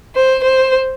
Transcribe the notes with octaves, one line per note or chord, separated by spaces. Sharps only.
C5
C5